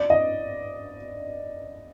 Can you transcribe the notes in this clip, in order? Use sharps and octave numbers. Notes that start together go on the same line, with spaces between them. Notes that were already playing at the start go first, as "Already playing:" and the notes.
Already playing: D5
D#5